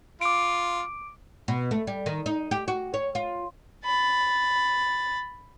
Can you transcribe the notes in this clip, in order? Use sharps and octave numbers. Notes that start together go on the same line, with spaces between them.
F4 D6 D7
B2
A3
G3
D#3
D#4
G4
F#4
C#5
F4
B5 A6